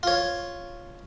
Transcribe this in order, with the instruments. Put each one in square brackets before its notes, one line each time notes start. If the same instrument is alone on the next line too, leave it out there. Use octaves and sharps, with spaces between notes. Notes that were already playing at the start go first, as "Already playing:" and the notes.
[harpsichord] F4 C#5